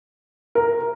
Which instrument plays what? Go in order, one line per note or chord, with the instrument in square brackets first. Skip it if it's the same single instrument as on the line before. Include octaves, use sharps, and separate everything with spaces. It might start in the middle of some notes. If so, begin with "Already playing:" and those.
[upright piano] A#4